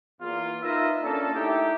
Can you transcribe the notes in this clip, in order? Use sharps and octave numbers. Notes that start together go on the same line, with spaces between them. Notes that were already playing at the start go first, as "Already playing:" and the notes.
E2 A#3 F4
D#4 F4 A#4 B4 D#5 E5
A#3 C#4 D4 A4
A3 D#4 E4 G4